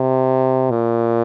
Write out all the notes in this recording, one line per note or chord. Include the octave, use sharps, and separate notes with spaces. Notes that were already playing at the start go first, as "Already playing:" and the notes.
Already playing: C3
A#2